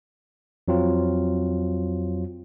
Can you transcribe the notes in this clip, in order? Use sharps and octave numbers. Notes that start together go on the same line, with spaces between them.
F2 F#3 C4 F4